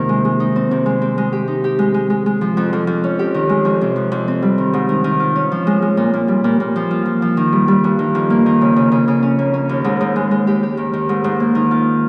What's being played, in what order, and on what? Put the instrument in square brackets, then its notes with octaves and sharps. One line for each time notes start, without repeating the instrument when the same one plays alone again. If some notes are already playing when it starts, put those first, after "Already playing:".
Already playing: [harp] G#2 C3 D#3 A#3 F4
G#3
G#3
D#4
C4
C3
G#3
C4
G#3
G4
D#4
G4
G#3
G#3
G#3
G#3
F3
F2
F2
F2
C#4
G4
D#3
G#3
F2
C3
F2
F2
C4
G3
D#3
G#2
D#3
D#3
F4
C#4
F3
G#3
G#3
A#2
A#2
G3
A#2
A#2
F3
F4
F3
F3
D#3
G3
G3
G2
D#3
F2
A#3
D#3
C#3
C#3
C#3
C#3
C#4
A#3
C#4
D#2
G#2
G#2
G#3
G#3
G4
G4
D#3
D#3
G#2
G#2
A#3
D#3
F4